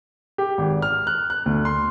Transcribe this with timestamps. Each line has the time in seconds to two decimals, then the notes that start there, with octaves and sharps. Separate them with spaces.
0.38 G4
0.58 G#1
0.82 F6
1.07 F#6
1.30 F#6
1.46 D2
1.65 C6